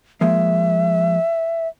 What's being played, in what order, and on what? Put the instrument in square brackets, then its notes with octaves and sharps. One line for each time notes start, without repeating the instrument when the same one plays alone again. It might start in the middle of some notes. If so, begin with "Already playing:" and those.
[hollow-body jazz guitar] F3 G#3 A#3 [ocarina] E5